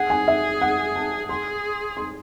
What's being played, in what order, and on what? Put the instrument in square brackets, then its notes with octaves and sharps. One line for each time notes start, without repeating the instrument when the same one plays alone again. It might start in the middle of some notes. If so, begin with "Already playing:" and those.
Already playing: [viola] G#4 [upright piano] F#5
[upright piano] G#5
E5
F#5
A5
[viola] G#4 [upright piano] C6
[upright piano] C6